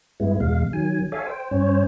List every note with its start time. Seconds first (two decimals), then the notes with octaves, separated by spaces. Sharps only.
0.20 G2 G#3 B3 E4
0.40 E2 B2 G#3 F5
0.73 D#3 F#3 G#5
1.12 A4 C#5 D5 E5 F5 G#5
1.27 C5 G5
1.51 G2 C#4 C5 C#5